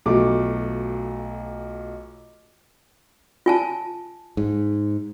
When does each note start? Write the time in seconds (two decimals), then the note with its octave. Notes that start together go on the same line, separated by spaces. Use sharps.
0.06 B1 F#3 A3 F4 D6
3.46 F4 G#5 A5
4.37 G#2